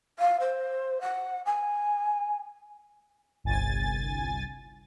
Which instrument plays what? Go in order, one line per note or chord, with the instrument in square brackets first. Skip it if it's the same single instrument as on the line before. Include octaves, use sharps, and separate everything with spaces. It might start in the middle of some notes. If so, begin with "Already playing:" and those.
[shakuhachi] F5
C5
F#5
G#5
[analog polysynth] G1 C2 G#5 A6